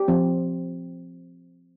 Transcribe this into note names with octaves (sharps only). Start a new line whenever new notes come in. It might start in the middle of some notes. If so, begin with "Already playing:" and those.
Already playing: G4
F3 C4